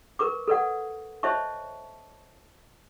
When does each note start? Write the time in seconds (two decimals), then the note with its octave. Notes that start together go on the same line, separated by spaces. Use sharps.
0.19 A#4 B4 C#6 D6
0.48 A4 B4 D5 F#5
1.23 C5 C#5 D#5 E5 A5 C#6